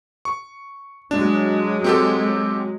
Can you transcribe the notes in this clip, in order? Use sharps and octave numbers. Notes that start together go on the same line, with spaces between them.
C#6
F#3 G#3 D4
C4 G4 A4